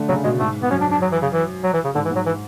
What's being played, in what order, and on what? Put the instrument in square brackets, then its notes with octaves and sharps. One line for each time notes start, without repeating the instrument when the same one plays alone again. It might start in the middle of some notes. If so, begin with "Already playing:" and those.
Already playing: [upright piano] D3 A3
[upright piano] C#3 [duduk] F#3
[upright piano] B2 [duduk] G#3
[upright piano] G#2 [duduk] A3
[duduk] B3
[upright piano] F#2 [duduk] C#4
[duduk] D4
D4
F#3
E3
C#3
E3
F#3
E3
C#3
[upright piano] G#2 [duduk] D3
[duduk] E3
[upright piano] G#2
[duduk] F#3
E3